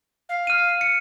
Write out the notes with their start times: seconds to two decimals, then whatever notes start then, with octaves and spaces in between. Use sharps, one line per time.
0.29 F5
0.47 F6 D#7
0.81 C#7